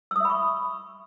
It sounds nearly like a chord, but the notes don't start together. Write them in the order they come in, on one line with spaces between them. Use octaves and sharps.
E6 D#6 E5 B5 C#6